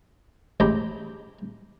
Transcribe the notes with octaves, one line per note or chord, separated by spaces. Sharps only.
A1 G#3 G4 G5 A#5 B5